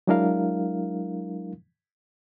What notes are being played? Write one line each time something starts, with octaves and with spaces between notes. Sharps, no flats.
F#3 G#3 D4 E4 A#4 F5